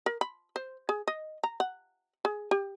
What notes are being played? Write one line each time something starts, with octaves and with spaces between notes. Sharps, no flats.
A#4
B5
C5
G#4
D#5
A#5
F#5
G#4
G4